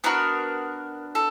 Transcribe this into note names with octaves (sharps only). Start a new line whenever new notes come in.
B3 D4 F#4 A#4
A4